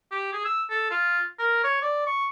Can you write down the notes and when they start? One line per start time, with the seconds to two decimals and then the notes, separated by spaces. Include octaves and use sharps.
0.11 G4
0.33 G#4
0.45 E6
0.70 A4
0.91 F4
1.39 A#4
1.64 C#5
1.82 D5
2.07 C#6